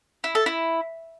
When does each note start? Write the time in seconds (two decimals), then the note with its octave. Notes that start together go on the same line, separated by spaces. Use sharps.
0.24 E4
0.35 A4
0.46 E4